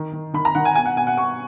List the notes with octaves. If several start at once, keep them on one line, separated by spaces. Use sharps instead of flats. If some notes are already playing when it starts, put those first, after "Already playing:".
Already playing: D#3
D#3
D#3 B5
A#5
D#3 F#5
G#5
B2 G#5
F#5
B2 G#5
F#5
B2 C#6